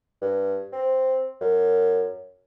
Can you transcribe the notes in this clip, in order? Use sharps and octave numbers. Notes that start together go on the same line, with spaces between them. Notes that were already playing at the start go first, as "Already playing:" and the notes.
G2
C4
F#2